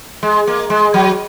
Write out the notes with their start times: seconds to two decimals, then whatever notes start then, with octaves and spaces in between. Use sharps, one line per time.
0.23 G#3
0.47 A#3
0.70 G#3
0.94 F#3